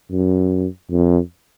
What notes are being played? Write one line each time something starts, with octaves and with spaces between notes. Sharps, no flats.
F#2
F2